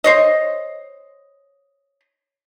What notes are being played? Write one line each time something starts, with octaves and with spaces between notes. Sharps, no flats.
C5 C#5 D#5